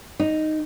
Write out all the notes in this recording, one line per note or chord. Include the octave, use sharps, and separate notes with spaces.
D#4